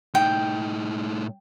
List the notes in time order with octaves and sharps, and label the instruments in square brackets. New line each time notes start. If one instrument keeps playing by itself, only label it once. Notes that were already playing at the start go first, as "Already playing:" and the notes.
[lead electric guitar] A2 D#4 [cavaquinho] G5